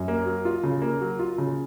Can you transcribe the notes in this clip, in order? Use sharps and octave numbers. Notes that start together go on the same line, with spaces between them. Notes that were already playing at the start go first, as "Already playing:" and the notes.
Already playing: F#2
A#3
F#3
F4
C#3
A#3
F#3
F4
C#3